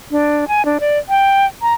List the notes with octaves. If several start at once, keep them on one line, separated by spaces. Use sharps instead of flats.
D4
G#5
D4
D5
G5
A#5